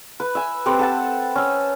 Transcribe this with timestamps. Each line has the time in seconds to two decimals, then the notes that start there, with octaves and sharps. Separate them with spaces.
0.20 B4
0.35 E5 G#5
0.66 C4 G4 A4 B4
0.79 A4 F#5 A5
1.35 C#4 E6